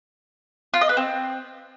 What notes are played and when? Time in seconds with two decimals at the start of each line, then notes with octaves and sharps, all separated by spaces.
0.74 F4
0.81 D#5
0.89 B4
0.97 C4